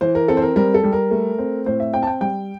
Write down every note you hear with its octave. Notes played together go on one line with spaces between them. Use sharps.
E3 C5
A#4
C4 A4
C5
A#4
G3 A#4
A4
G3
A#4
A3
C4
A2 C5
E5
C4 G5
A5
G5
G3 G5